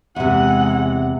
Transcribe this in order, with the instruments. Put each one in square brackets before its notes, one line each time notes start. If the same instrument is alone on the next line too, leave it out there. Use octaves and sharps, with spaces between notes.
[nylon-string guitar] E2 C3 [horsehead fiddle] G#3 F#5